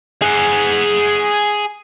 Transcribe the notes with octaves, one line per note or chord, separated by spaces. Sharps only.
G#4 F#5